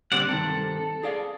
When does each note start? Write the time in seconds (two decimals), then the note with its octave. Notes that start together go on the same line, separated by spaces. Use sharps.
0.12 D3 G3 C4 D5 F#5
0.29 G2 C3 D#3 A4
1.03 G#4 D5 F5